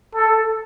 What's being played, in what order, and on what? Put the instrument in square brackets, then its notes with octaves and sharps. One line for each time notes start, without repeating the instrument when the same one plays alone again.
[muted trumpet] A4